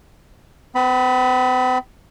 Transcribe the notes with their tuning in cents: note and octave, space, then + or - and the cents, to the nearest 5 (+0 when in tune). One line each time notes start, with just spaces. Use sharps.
C4 -45 B5 +0